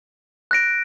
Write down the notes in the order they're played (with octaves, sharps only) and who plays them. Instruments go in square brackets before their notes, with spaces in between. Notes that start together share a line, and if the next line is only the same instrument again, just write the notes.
[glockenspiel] F#6 A#6 D7